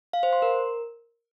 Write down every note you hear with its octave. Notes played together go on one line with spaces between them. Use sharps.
F5
C5
C6
A#4